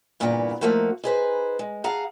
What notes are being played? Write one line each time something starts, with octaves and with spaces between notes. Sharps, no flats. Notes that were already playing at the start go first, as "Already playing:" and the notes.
G2 A#2 C#3 E3 B3 A#5
F3 A3 A#3 D#4 F#4
D#4 G#4 B4 C5
G#3
G#4 F5 F#5 A5 A#5